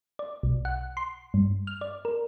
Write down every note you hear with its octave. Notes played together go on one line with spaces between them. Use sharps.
D5
B1
F#5
C6
G2
F6
D5
A#4